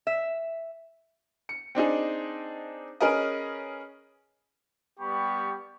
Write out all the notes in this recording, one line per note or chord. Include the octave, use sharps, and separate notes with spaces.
E5
C#7
C4 D4 D#4 G#4
C#4 G#4 A#4 B4 D#5
G3 B3 G4 B5 C#6